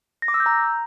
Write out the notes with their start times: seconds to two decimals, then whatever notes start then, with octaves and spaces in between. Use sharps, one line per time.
0.22 A#6
0.28 D6
0.34 E6
0.40 G6
0.46 A#5